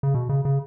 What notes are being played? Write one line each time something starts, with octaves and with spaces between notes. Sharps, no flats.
C#3
B2
C#3
C#3